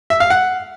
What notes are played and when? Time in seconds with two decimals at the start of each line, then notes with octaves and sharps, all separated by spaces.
0.10 E5
0.20 F5
0.30 F#5